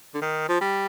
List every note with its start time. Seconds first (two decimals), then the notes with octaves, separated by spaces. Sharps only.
0.14 D3
0.21 D#3
0.49 F3
0.61 G3